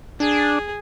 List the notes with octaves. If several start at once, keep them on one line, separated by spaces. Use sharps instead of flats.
D4 G#4